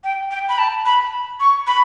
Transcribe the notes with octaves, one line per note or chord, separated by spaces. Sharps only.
G5
G5
B5
A5
B5
C#6
B5